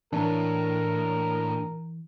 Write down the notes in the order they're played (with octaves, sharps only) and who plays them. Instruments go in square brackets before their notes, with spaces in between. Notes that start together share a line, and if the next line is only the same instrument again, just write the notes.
[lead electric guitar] A2 [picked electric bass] E3 [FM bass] D4 [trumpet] A#4